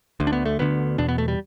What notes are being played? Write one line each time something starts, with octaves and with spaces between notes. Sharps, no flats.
D2 D3
D4
B3
A3
D2 D3 B3
E2 B2 D4
B3
A3
G3